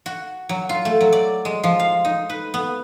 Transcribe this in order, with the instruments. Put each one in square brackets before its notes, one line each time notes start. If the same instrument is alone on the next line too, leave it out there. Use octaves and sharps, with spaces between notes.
[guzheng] F#4
F#3
F4
A3
F#3
D5
G#3
F3
F5
D#4
B4
B3